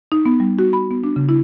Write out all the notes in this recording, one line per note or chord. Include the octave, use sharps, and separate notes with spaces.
D#4
B3
G3
F#4
B5
B3
D4
C#3
E4